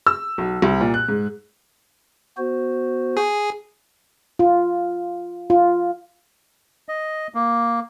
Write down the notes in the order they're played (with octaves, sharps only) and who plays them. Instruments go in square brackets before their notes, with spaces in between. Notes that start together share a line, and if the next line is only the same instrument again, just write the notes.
[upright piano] E6
B1
C2
A#2
F#6
G#2
[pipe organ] B3 F#4 C5
[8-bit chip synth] G#4
[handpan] F4
F4
[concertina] D#5
A#3